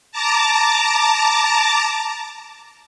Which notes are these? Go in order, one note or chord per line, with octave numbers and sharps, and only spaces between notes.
A5 A#5 D6